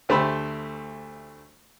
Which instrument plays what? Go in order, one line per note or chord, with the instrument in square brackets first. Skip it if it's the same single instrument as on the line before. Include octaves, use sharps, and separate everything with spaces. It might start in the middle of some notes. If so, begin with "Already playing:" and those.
[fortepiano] D2 A3 G4 C5 B5 E6